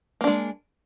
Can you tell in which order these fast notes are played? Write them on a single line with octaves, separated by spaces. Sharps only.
A#3 D4 G#3